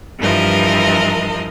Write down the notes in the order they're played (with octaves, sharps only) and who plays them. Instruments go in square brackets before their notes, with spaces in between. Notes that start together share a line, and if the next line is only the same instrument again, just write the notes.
[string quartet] G2 E3 F3 A#4 D#5